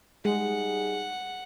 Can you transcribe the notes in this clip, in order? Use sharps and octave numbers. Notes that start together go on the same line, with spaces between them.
G3 G#3 D#4 G#4 F#5